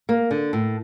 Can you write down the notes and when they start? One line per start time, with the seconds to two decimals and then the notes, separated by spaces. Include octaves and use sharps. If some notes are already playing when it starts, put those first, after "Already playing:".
0.09 A#3
0.31 D3
0.53 A2